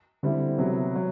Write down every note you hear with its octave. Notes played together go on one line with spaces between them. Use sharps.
D3 G3 C4 E4
C3 F#3 B3
F#3